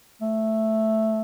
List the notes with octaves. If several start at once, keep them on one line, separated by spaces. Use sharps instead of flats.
A3